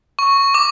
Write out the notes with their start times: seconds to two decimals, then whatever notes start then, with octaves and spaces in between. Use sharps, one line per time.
0.19 C#6
0.54 D6